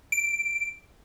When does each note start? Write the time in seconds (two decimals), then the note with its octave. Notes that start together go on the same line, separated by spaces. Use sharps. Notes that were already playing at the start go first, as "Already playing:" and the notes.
0.12 D7